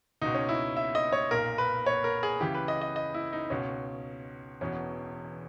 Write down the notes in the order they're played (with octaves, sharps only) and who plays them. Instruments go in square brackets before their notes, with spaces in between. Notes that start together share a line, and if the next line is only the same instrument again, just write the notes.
[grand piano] C#2 B2 D#4
C#4
E4
E5
D#5
C#5
B1 A#2 A#4
B4
C#5
A#4
G#4
C#2 C#3 E3 G4
B4
D#5
D#5
D#5
E4
D#4
C#2 B2 C#4
E1 E2 B2 C#4